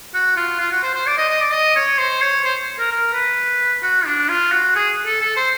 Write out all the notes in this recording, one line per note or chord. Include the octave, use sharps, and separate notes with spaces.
F#4
F4
F4
F#4
C5
C5
D5
D#5
D#5
D5
D#5
C#5
C5
C#5
C5
A#4
A#4
B4
F#4
D4
F4
F#4
G#4
A4
A4
C5